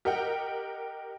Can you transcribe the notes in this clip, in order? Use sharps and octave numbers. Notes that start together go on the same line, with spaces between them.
G4 A#4 D#5 F#5 G5